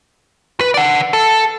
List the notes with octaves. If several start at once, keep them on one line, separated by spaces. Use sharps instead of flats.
B4
D5 F#5
A4